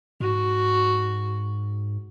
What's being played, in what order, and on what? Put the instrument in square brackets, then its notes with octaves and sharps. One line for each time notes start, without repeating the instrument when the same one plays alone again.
[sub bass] G#2 [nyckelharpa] F#4